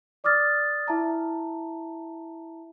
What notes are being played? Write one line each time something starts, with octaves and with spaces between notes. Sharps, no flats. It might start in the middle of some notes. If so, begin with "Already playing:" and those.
D5 D6 D#6 F6 A6
E4 E5 A5 A#5